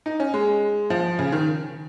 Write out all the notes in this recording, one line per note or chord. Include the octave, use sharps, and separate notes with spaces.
D#4
C#4
G#3
F3
C#3
D#3